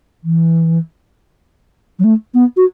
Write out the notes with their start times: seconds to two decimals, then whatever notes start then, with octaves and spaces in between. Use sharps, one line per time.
0.24 E3
1.99 F#3
2.04 A3
2.34 B3
2.57 F#4